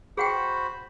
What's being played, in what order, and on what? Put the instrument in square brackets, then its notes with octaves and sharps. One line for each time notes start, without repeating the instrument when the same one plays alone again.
[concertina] F#4 C5 B5 [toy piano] G#4 F#5 G5